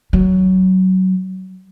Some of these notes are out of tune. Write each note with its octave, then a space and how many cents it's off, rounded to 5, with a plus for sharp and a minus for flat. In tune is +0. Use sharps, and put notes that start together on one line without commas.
F#3 +15